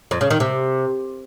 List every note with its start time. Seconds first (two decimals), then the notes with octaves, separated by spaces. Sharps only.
0.11 F2
0.21 C#3
0.30 D#3
0.40 C3